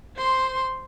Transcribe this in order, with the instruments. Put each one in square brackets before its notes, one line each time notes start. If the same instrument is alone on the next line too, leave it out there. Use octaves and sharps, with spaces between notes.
[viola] C5 C6